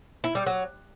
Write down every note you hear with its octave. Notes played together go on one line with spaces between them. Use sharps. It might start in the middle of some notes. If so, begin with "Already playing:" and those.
E4
G3
F#3